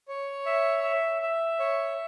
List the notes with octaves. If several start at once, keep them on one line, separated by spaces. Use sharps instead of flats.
C#5
E5
E5
E5
C#5